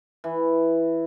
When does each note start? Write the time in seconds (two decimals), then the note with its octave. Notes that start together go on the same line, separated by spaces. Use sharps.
0.24 E3